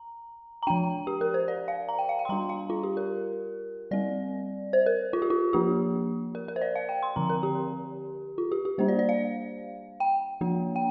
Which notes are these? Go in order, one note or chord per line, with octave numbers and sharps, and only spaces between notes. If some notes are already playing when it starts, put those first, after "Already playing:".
Already playing: A#5
A#5
F3 D4 G5
G4
A#4
C5
D5
F5
A#5
G5
F5
G5
C6
G3 D4 A#5
F5
F4
G4
A#4
G3 C4 D5
C5
A#4
F4
G4
F4
F3 A#3 D4 G4
A#4
A#4
C5
D5
F5
G5
C6
D3 F3 C4 A#5
A#4
G4
F4
G4
G4
G3 A#3 D4 C5
D5
D5
F5
G5
F3 A#3 D4
G5